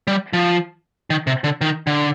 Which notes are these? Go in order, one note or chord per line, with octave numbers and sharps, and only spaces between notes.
G3
F3
D#3
C3
D3
D#3
D3